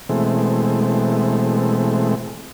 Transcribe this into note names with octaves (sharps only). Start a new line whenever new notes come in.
B2 E3 G#3 A3 C4